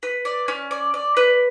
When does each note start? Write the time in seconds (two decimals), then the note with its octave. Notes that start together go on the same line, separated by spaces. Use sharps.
0.03 B4
0.25 D5
0.48 C#4
0.71 D5
0.94 D5
1.17 B4